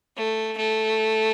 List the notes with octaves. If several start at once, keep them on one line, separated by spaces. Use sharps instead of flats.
A3
A3